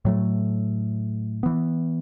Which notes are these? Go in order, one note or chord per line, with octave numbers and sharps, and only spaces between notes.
A2 F#3 A3
E3 B3